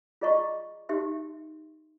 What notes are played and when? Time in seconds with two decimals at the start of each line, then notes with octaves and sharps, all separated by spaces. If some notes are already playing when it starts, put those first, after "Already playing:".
0.21 F4 G#4 D5 D#5 A#5 C#6
0.89 D#4 G4 E5 C6